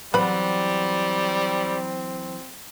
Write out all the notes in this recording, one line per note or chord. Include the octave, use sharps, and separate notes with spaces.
E3 F#3 G3 B3 C4 B4 C5 B5